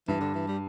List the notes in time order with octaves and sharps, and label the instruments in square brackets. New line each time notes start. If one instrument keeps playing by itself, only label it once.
[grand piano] G2 [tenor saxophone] E3
[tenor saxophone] D3
E3
G3